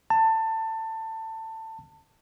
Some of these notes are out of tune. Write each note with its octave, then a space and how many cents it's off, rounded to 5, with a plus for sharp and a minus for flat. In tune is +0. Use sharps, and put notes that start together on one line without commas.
A5 +20